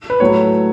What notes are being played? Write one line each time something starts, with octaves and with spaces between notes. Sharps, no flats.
B4
A2 F#3 A3 C#5